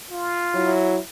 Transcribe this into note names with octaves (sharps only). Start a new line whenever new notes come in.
F4
F#3 E4